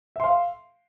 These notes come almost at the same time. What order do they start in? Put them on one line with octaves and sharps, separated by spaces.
E5 C6 F5